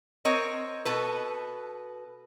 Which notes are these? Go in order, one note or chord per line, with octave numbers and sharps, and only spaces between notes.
C4 A#4 C#5 D#5
B2 A4 B4